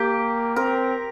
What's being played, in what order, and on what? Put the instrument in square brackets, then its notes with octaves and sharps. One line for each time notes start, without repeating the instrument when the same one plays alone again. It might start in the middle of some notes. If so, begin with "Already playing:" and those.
Already playing: [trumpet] A#3 [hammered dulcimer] G4
[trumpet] C4 [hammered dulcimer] A#4